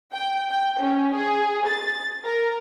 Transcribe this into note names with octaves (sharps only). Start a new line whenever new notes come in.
G5
G5
C#4
G#4
A6
A#4